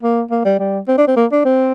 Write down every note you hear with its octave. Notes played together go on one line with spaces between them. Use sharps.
A#3
A#3
G3
G3
C4
D4
C4
A#3
D4
C4